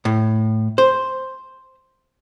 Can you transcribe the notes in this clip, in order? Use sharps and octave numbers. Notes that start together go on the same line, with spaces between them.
A2
C5